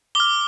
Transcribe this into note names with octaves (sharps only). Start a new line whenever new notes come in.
D6 F6 G7